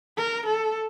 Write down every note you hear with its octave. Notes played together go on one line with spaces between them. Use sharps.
A#4
A4